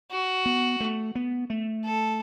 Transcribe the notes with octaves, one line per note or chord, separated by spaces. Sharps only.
F#4
B3
A3
B3
A3
A4